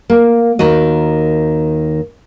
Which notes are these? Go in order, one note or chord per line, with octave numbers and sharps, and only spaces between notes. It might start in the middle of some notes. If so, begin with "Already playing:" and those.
A#3
D#2 D#3 F#4 D#5